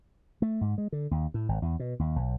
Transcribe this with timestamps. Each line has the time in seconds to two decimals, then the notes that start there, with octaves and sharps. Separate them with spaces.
0.42 A3
0.61 G#2
0.78 G#3
0.92 D3
1.11 D#2
1.34 A2
1.49 G#1
1.62 E2
1.80 B2
1.99 D#2
2.16 B1